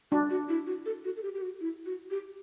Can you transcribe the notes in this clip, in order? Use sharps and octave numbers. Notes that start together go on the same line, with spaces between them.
D4 F#4
F#4
E4
F#4
A4
F#4
A4
G4
G4
F#4
E4
F#4
G4